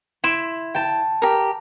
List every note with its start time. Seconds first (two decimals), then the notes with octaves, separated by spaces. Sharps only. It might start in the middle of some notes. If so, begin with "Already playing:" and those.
0.24 E4 C6 D7 E7
0.75 G5 A5
1.22 G4 A#4